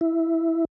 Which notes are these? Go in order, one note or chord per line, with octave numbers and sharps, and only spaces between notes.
E4